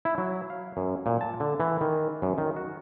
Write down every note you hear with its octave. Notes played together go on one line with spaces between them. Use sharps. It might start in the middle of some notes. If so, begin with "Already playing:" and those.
E4
F#3
F5
F#2
A#2
A5
D3
E3
D#3
F#2
D#3
F#4